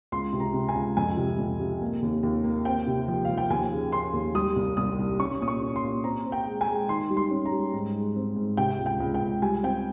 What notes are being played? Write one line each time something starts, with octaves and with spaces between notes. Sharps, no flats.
C#2 C6
C3
A#5
C3
G#5
C#2
F2 G#5
C3
F2
C3
A#3
D#2
D#2
A#3
C4 G5
C3
F3
F3 F5
G5
D#2 G#5
C#3
C#3 C6
D#2
G3 D#6
C2
C2 D#6
C2
C#4 C#6
A#2 D#6
C#6
C#4
C6
A#2
C4 A#5
C4
G5
G#3
G#5
G#3
D#3 C6
G3
C6
C#4
A#5
G3
G#2
G#3
C4
G#2
C3 G5
C#2
G5
C#2
G5
C#2
G3 G#5
C4 G5